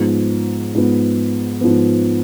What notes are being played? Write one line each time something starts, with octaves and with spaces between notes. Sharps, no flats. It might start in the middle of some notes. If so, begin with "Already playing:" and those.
Already playing: G#2 F3 B3
G#2 F3 B3
G#2 F3 B3